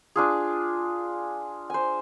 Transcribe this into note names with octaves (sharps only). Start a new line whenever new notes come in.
D4 F4 G#4
C5 G#5